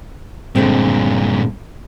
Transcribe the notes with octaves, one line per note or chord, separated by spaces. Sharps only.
G2 A#2 D3 G#3 C4